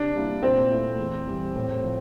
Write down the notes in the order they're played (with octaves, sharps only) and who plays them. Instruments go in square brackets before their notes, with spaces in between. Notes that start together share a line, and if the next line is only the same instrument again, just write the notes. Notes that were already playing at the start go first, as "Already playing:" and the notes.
Already playing: [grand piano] C3 [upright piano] D4
[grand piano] G3 A#3 E4
[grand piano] A#2 [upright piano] C4
[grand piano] A3 E4
E2
E3 G3
A2
F3